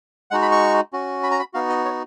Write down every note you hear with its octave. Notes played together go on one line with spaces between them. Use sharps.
G#3 D#4 F#4 F#5
B5
C#6
C#4 F#4
B5
A#5
B5
B3 D#4 F#4 F5
D#5
C#5